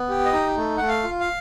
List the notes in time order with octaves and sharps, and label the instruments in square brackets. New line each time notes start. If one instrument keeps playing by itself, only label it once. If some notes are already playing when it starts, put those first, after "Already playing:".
Already playing: [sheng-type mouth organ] B3
G4
D#5
D#4
A3
A3 F#5
F5
F4
F5